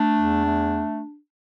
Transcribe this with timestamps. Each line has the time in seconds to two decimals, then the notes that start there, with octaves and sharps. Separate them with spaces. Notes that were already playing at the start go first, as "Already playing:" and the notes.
Already playing: A3 D4
0.16 E2
0.45 A3